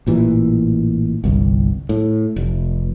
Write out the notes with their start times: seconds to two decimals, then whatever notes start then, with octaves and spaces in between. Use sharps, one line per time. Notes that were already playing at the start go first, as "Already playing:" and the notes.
0.07 A1 A#2 E3
1.24 G1 C2
1.89 A2
2.36 F1